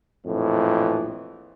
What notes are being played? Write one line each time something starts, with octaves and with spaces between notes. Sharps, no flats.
A#1 F2 A2 E3